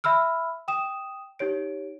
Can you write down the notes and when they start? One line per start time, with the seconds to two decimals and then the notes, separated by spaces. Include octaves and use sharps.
0.04 E5 B5 E6 F6
0.68 G5 D#6 E7
1.39 D#4 G4 C#5 D7